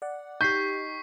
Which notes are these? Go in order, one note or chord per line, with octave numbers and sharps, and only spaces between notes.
D5 F#5
D#4 G4 C#6 G6 B6 C7